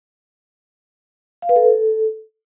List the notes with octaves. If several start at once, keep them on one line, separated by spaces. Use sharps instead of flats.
F5
B4
A4